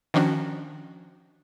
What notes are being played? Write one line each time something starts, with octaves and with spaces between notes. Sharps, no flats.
D#3 F3 C#4 D4 F#4